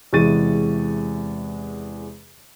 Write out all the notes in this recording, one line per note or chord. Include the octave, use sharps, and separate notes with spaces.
E2 C3 G#3 C#6 A6 D#7